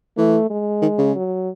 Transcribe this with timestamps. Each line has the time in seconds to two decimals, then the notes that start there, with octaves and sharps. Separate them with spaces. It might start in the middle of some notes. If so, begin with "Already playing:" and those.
0.18 E3 A3
0.50 G#3
0.82 D#3
0.98 C#3
1.16 F#3